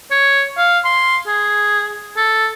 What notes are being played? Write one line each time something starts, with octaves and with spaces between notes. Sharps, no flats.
C#5
F5
C6
G#4
A4